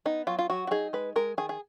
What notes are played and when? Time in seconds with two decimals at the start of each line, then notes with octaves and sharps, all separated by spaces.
0.05 B3 D#4
0.27 F#3 F4
0.39 F4
0.50 F#3 F#4
0.67 F#4
0.71 D#4 G#4
0.93 G#3 B4
1.16 G#3 A#4
1.38 D#3 G#4
1.49 G#4